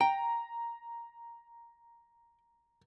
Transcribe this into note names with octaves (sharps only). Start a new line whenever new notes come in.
G5 A#5